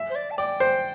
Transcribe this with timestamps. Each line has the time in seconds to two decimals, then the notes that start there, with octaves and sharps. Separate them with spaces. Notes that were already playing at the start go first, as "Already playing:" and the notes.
Already playing: E5
0.10 C5
0.15 D5
0.31 A5
0.38 D5 G5
0.60 C5